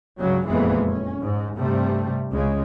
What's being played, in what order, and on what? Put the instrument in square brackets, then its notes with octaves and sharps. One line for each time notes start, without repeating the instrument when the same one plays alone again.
[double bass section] C#2 G2 C#3 F#3
F#1 F2 A#2 E3 G#3 B3
C#4
G#2
G2 C3 G3 A3
C#2 C#3 G#3